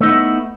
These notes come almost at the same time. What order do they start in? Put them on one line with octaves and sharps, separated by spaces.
A3 D#4 B3 E4